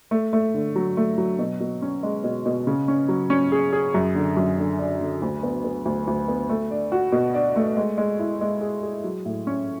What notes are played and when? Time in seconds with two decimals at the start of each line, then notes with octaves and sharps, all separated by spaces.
0.11 A3
0.33 A3
0.54 D3
0.76 F#3
0.97 A3
1.18 F#3
1.39 B2
1.60 B2
1.82 C#4
2.03 G#3
2.24 B2
2.46 B2
2.67 C#3
2.88 C#4
3.09 F#3
3.30 C#4
3.52 G#4
3.73 G#4
3.94 F#2
4.15 D3
4.36 F#2
4.57 D3
4.79 D4
5.01 D3
5.22 D2
5.43 B3
5.64 B3
5.85 D2
6.07 D2
6.28 B3
6.49 A3
6.71 D4
6.92 F#4
7.12 B2
7.34 D4
7.56 A3
7.77 G#3
7.98 G#3
8.19 E4
8.41 G#3
8.61 G#4
8.83 G#4
9.04 F#3
9.26 A2
9.47 C#4